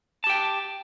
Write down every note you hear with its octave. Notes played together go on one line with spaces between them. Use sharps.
G4 G5 A5